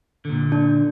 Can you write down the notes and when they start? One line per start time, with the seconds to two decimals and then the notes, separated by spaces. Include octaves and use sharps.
0.25 A#2 D3
0.52 D4